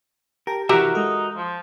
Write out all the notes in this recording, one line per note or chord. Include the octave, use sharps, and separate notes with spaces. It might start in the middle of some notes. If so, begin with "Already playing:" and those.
G4 A#4 G5 A5
C3 E3 F#4 G4 A#4 E5 A#5
G#3 D#4 A4
F3